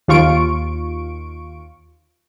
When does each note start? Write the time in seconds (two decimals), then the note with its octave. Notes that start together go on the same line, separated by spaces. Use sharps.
0.08 D#2 F4 C#6 D7